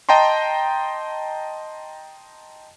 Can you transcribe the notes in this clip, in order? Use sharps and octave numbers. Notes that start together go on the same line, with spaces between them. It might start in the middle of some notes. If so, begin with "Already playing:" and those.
D#5 G5 A5 A#5 C6